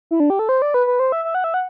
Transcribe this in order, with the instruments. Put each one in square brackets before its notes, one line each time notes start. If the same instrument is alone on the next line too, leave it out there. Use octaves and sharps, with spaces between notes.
[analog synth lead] E4
D4
G4
A4
C5
D5
B4
B4
C5
E5
E5
F#5
E5
F#5